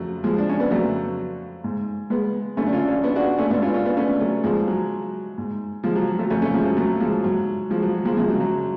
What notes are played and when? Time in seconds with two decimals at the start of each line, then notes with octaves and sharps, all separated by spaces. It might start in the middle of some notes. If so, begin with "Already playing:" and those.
Already playing: F2 C#3 F#3 A3
0.24 F3 G#3
0.38 D4
0.49 C#4
0.60 B3
0.71 F2 C#3 F#3 A3
1.64 G#2
2.10 G#3 B3
2.57 F#2 D3 A3 C#4
2.67 D4
2.73 C#4 F4
2.88 C#4 F4
3.04 B3 D4
3.16 D4 F#4
3.38 A3 C#4
3.50 G#2 B3 D4
3.62 C#4 F4
3.74 C#4 F4
3.86 B3 D4
3.97 A3 C#4
4.20 F#3 A3
4.44 G#2 F3 G#3
4.67 F#3
5.38 G#2
5.84 F3 G#3
5.95 F#3
6.07 F#3
6.19 F#3 A3
6.30 F2 C#3 A3 C#4
6.42 A3 C#4
6.54 F3 G#3
6.65 F#3
6.77 F#3 A3
7.00 F3 G#3
7.24 G#2 F#3
7.70 F3 G#3
7.82 F#3
7.94 F#3
8.05 F3 G#3
8.17 F#2 C#3 F3 G#3
8.29 F#3
8.40 F#3